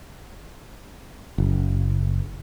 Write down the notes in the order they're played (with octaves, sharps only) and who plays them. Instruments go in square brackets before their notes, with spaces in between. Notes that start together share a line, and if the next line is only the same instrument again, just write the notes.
[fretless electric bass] F#1